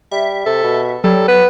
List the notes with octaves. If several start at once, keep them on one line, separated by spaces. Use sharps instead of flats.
G3 E5
C3 A4
B2
F#3 G3 A4
B3 B4